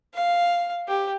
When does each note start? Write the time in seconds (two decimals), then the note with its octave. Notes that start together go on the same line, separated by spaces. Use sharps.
0.14 F5
0.88 G4